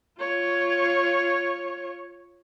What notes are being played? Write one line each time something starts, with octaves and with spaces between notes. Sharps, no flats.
F4 C#5